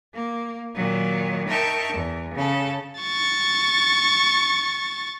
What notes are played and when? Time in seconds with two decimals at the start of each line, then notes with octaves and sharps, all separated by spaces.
0.14 A#3
0.75 A#2 D#3 F#3
1.48 D#4 A#4 E5 G5 A5 C#6
1.92 E2
2.34 C#3 A4
3.01 C#6 A6